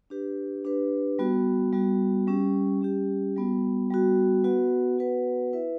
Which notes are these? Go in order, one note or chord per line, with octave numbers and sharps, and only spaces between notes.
D4 G4 B4
D4 G4 B4
G3 B3 F#4
G3 B3 F#4
G3 C#4 G4
G3 C#4 G4
G3 B3 F#4
G3 B3 F#4
B3 F#4 B4 F#5
B3 F#4 B4 F#5
E4 B4 E5